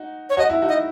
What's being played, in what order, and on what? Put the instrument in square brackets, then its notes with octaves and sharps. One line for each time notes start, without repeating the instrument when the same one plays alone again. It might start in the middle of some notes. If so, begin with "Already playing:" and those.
Already playing: [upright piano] D#4 F#4
[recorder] C#5
[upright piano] F#4 [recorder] D#5
[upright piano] E4
D#4 F#4
[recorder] D#5